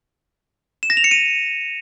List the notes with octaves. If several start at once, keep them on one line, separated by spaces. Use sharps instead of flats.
E7
A#6
F7
C#7
D#7